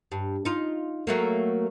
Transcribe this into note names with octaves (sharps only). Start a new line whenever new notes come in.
G2
D#4 F4
F#3 A3 A#3